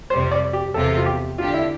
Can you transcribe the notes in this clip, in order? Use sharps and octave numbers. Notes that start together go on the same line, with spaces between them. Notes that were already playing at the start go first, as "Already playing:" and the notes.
F2 C3 G3 C5
D5
G4
E2 C3 F3 C4 F4 A4
F4
G4
D3 G3 D4 F4 G4
E4